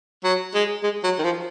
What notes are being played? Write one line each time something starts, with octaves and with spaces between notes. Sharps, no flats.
F#3
G#3
G#3
F#3
D#3
F3